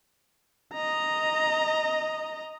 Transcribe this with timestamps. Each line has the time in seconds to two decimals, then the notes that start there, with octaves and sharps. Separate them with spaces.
0.74 D#5 A#5